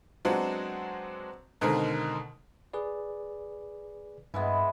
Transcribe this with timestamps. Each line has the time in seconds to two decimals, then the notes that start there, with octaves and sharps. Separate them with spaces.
0.25 F#3 G#3 B3 C4 D4 F#4
1.61 B2 D3 D#3 G#3 C4 A#4
2.73 G#4 B4 D5
4.34 G2 E3 G#3 B3